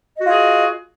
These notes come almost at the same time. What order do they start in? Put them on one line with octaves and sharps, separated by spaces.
D#5 F#4 F4 G#4